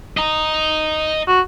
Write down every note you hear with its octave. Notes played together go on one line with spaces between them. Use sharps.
D#5 A#5
F#4